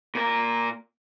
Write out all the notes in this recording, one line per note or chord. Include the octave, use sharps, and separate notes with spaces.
A#2 A#4